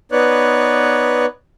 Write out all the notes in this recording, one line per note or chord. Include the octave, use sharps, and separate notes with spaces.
B3 D#4 B4 C#5 D5 F#6